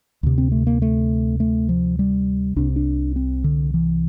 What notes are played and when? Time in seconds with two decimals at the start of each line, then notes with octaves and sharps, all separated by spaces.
0.23 D2 C3
0.38 C4
0.52 A3
0.67 A#3
0.82 A3
1.40 A3
1.69 F3
1.99 G3
2.56 C2 C3 D4
2.76 D4
3.16 C4
3.44 D3
3.74 E3